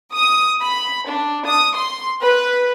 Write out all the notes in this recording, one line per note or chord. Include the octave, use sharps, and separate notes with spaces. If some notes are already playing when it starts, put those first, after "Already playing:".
D#6
B5
D4
D#6
C6
B4